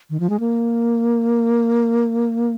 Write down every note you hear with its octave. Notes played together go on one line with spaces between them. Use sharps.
D#3
F3
G#3
A#3